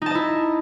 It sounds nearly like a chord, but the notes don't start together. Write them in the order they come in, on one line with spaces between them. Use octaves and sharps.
D#4 A5 D#5 E4